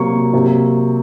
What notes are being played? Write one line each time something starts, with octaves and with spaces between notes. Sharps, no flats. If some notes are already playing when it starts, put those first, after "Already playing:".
Already playing: C3 F#3 A#3 C#6
C3 F#3 A#3